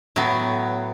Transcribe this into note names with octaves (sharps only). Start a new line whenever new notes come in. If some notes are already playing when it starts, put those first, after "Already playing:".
A2 F#3 B3